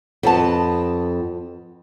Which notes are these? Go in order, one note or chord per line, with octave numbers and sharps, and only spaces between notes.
F2 B3 A5